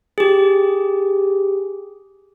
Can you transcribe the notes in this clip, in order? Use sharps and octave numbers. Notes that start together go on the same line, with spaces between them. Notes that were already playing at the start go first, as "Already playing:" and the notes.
G4 G#4